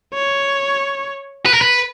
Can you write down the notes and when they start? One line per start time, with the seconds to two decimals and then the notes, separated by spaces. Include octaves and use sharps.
0.14 C#5
1.46 B4
1.53 A#4
1.61 B4